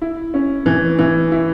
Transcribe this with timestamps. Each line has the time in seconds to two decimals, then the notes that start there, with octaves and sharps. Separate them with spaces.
0.01 E4
0.34 C#4
0.66 E3
0.99 E3
1.32 E4